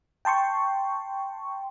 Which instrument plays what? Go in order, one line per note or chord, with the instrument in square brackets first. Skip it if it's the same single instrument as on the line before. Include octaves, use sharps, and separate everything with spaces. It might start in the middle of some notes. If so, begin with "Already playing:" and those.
[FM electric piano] G5 A5 C6 C#6